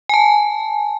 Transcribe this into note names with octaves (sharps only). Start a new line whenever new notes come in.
G#5 A5